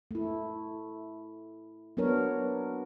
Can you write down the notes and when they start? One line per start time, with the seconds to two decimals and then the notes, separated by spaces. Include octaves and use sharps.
0.11 A3 E4
1.97 F#3 B3 D4 A#4 C#5